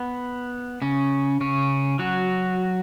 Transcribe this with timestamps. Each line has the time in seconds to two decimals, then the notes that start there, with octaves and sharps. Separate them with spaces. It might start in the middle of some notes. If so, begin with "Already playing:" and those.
Already playing: B3
0.82 C#3 C#4
1.41 C#3 C#4
1.99 F#3 F#4